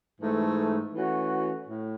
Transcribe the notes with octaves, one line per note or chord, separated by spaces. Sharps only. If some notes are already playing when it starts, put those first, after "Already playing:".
G#2 E3 A3
E3 A3 C#4 F#4
A2